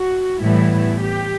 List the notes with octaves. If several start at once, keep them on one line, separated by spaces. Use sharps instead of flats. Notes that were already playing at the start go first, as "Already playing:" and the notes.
Already playing: F#4
A2 E3 G3 B3 E4
G4